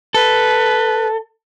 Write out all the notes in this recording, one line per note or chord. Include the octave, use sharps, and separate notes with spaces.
A4 B4